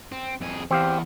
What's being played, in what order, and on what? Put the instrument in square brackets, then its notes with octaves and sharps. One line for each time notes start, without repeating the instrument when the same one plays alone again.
[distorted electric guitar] C4
F2 G#4
[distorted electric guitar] E2 [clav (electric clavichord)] C4 G4 F5